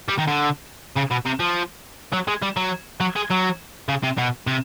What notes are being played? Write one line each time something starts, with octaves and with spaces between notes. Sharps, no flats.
G3
D#3
D3
C#3
B2
C3
F3
F#3
G#3
G3
F#3
F#3
G#3
F#3
C#3
C3
B2
C3